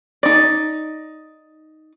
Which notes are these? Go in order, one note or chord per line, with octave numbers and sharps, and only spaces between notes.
D#4 D5